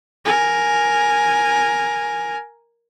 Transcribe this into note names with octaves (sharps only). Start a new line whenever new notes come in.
A#4 G#5